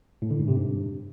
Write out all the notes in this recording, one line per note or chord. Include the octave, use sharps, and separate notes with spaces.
A2
D3
G#2
C3
G2